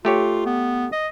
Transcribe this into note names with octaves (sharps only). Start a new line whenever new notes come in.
A3 F4 G4 C#5
B3
D#5